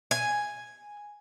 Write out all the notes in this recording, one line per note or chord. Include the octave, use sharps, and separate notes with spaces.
G#5